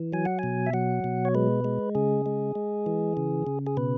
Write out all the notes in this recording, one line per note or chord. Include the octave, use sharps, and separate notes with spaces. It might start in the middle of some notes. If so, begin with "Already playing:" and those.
Already playing: E3
F#3 G#5
F#5
B2 G#5
E5
F#3 F#5
B2
C#5
G#3 B4
G#3
C#3 G#4
G#3
G#3
E3
C#3
C#3
G#4
B2 B4